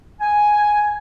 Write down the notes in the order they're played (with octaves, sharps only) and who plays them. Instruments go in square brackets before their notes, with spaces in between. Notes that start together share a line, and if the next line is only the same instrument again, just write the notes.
[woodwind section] G#5